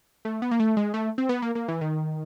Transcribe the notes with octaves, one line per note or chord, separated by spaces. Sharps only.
A3
B3
A#3
A3
G#3
A3
C4
B3
A#3
A#3
E3
D#3